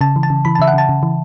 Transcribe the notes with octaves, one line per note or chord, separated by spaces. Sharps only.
C#3 A5
E3
A5
C#3
E3 B5
A5
C#3 E5
F#5
C#3 A5
C#3
E3